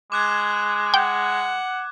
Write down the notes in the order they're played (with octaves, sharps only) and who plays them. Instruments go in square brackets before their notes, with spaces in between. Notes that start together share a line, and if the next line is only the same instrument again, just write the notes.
[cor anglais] G#3 [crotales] D6 F#6 G#6
[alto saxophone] F#5 [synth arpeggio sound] G5